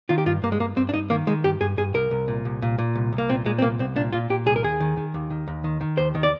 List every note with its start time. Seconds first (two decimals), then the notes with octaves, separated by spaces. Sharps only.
0.09 D#3 F4
0.18 G4
0.26 G2 F4
0.43 G2 A#3
0.52 G#3
0.60 G2 A#3
0.76 G2 C4
0.89 D4
0.94 G2 D#4
1.10 D#3 A#3
1.27 D#3 G#3
1.44 G2 G4
1.61 G2 G#4
1.77 G2 G#4
1.94 C2 A#4
2.11 C2
2.28 A#2
2.45 C2
2.62 A#2
2.79 A#2
2.96 C2
3.13 C2
3.18 A#3
3.29 A#2 C4
3.45 A#2 G#3
3.58 C4
3.62 C2 A#3
3.79 C2 C4
3.96 A#2 D4
4.13 A#2 F4
4.30 A#2 G4
4.46 C2 G#4
4.56 A#4
4.63 D#2 G#4
4.80 D#3
4.97 D#3
5.14 D#2
5.30 D#3
5.48 D#2
5.64 D#3
5.81 D#3
5.98 D#2 C5
6.15 D#3
6.23 D5